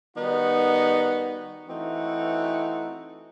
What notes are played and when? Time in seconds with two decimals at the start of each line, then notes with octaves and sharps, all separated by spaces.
0.16 D#3 G3 B3 D#4 F#4
1.68 E3 A3 C4 D#4 F#4